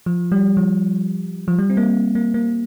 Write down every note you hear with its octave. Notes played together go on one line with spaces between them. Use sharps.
F3
G3
F3
F3
G3
C4
A#3
A#3
A#3